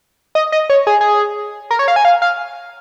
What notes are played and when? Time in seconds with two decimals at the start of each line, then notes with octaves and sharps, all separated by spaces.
0.35 D#5
0.52 D#5
0.70 C#5
0.87 G#4
1.01 G#4
1.71 A#4
1.79 C#5
1.88 F5
1.96 G#5
2.05 F5
2.22 F5